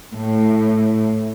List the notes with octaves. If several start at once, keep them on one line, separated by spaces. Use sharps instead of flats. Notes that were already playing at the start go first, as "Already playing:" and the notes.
A2